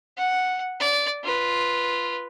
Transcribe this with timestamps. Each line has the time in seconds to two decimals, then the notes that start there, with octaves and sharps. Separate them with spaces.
0.17 F#5
0.80 D5
1.23 F4 B4